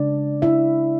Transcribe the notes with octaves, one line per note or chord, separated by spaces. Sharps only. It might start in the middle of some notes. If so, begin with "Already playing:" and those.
Already playing: C#3 G#3 D4 D5
E4 E5